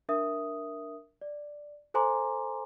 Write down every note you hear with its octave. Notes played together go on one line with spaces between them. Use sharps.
D4 A#4 E5 D#6
D5
A4 C5 G#5 A#5 C6 D6